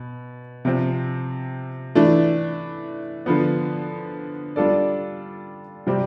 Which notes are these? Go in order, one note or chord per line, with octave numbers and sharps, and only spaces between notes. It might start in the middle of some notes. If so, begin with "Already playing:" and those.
Already playing: B2
C3 F3 C4
E3 A3 D4
D3 F3 B3
G3 D4 F4 A4 D5
C3 G3 C4 G4